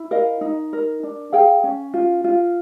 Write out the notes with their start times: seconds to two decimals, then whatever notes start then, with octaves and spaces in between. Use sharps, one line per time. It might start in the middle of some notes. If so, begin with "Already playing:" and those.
Already playing: E4
0.11 A#4 D#5 F5
0.41 D#4
0.73 A#4
1.03 D4
1.32 G#4 F5 G5
1.63 C#4
1.94 F4
2.24 F4